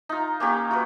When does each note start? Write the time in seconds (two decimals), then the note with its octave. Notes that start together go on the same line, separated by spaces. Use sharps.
0.09 D#4 F4
0.40 A#3 C#4 G4
0.71 F4 F#4 B4